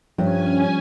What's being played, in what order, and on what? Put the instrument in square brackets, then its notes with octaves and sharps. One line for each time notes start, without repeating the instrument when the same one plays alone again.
[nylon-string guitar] G2 [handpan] F3 G3 C#5 [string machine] C#4 G#5